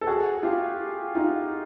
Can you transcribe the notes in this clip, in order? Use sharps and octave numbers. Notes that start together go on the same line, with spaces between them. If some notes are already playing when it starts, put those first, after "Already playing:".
A4
F#4 G#4
F4 G4
D#4 F4